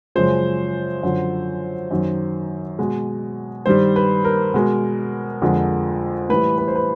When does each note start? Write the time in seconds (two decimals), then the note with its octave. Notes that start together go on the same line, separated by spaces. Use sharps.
0.15 F#2 C#3 F3 G#3 C5
1.03 F#2 D3 F3
1.91 F#2 D#3 F#3
2.79 B2 G#3
3.66 G2 D#3 G3 C5
3.96 B4
4.25 A#4
4.54 B2 G#3
5.42 F2 D3 F3 G#3
6.29 A2 E3 G3 B4
6.58 B4
6.68 C5
6.76 B4